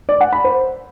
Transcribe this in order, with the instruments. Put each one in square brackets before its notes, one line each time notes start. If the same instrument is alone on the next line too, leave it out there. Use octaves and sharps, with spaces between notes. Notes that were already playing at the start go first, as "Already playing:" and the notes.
[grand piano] D5
F#5
B5
C5